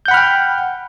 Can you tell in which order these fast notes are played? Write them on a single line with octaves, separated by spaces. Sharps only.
G6 F#5 B5 F6 G5